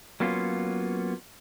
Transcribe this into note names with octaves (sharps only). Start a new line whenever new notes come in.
F#3 A#3 B3 C#4 F4